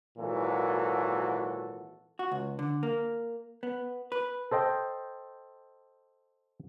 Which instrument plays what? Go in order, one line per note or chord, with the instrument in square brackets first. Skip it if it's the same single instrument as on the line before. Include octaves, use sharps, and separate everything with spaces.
[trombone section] G#1 A#2 E3 F#3 F#4 A4
[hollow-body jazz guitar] F#4
C#2
D3
A#3
B3
B4
[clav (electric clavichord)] A4 C5 D#5 G5